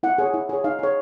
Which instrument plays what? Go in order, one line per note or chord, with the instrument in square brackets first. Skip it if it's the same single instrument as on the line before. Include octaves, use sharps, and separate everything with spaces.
[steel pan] E4 F#5
G#4 C#5
E4
G#4 C#5
D#4 F5
G#4 C#5